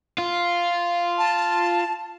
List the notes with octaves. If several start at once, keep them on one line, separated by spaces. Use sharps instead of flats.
F4
A5